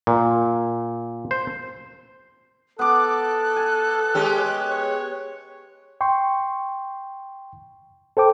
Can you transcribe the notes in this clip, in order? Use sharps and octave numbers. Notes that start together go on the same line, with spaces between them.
A#2
C5
B3 A4 D6 F#6
G#5
G#3 C#4 G4
C#5
G5 C6 C#6
A4 C5 G5 D6